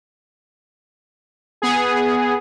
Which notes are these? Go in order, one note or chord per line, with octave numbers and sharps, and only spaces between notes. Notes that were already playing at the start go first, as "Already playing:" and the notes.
B3 G#4